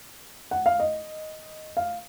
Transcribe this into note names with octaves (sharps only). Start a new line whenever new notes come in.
F#5
F5
D#5
F5